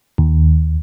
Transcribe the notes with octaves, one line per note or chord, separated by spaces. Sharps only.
D#2